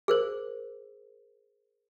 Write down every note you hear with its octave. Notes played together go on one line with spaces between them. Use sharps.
G#4 A#4 C5